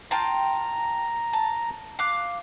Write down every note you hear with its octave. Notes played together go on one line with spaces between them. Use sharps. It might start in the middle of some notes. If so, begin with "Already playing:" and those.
F4 G5 A5 A#5
A5
F5 D6 F#6